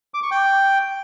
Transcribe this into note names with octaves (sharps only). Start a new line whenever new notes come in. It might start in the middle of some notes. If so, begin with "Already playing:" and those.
D6
C#6
G5